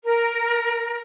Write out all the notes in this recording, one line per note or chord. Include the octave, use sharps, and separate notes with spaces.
A#4